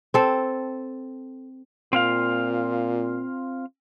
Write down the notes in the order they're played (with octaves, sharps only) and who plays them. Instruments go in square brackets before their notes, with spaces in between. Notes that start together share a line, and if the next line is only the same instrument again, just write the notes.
[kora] C4 A4
[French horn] A#2 [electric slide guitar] C4 F4 F5